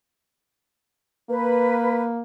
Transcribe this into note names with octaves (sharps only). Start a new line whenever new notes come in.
A#3 B4